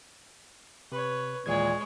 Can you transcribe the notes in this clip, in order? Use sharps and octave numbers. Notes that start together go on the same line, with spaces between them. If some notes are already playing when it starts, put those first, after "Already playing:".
C3 B4 C#5
D#2 A#2 E3 G#3 C#5 G#6